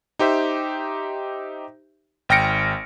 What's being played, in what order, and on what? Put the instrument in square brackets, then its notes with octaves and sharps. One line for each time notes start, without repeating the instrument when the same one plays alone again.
[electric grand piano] D#4 G4 C5 E5
G#1 G5 F6 A#6 C#7 D7